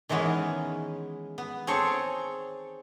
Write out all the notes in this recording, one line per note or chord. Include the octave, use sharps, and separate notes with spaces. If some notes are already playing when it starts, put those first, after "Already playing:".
D#3 E3 G#3 B3 C#4
B3
C4 G#4 A4 C#5